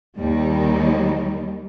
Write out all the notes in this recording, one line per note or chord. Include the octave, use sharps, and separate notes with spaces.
D#2 D#3 G3